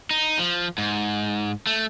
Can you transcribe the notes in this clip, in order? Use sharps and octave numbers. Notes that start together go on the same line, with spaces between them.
D#4
F3
G#2
A3